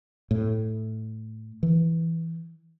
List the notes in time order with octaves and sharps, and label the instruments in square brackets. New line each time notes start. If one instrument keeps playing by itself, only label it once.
[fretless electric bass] A2
E3